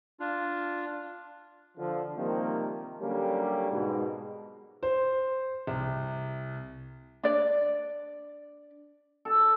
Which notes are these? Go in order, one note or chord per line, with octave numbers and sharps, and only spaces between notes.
D4 F4
D3 F3
C3 D#3 F3 G3 A#3
D3 F#3 G3 A#3 C#4 G4
G#2 B2
C5
C2
D4 D5
A4